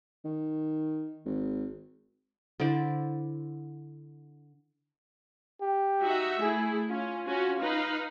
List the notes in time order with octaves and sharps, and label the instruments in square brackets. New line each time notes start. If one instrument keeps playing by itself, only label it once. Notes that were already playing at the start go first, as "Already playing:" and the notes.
[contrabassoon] D#3
G#1
[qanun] D3 E4 C5 D5
[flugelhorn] G4
[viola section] D#4 F#4 E5
[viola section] A3 E4 [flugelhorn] G#4
[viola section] C#4 [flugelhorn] F4
[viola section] C#4 F#4
D#4 B4 F5